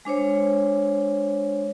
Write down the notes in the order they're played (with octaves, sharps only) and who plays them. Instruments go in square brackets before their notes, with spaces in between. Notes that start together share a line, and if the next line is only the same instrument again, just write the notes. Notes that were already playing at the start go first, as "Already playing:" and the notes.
[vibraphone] G#3 D4 C5 C#5